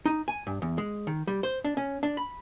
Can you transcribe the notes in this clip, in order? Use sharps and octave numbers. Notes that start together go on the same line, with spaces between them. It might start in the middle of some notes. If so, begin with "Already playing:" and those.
D#4
G#5
G2
E2
G#3
D#3
G3
C5
D4
C#4
D4
B5